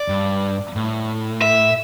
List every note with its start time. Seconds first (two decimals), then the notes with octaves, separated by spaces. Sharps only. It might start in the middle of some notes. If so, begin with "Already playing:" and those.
Already playing: D5
0.08 G2
0.76 A2
1.42 E5